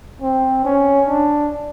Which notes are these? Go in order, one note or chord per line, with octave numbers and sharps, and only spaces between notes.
C4
C#4
D4